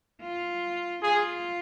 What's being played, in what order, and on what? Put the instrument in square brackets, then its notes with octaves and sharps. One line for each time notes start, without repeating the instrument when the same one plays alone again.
[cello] F4
[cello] F4 [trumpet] G#4